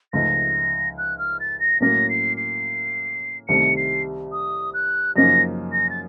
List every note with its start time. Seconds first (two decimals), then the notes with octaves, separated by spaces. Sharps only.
0.13 C#2 C#3 F3 A3 D#4 A#6
0.97 F#6
1.18 F6
1.39 A6
1.59 A#6
1.80 A2 F#3 A#3 C#4 A#6
2.09 C7
2.36 C7
3.48 C2 C3 D#3 A3 C#7
3.76 C7
4.32 D#6
4.73 F#6
5.16 F#2 C#3 F3 A#3 D#4 A#6
5.72 A#6
5.89 A6